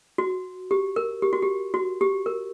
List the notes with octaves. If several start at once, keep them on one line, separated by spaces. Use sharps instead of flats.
F#4
G4
A#4
G4
F#4
G4
F#4
G4
A#4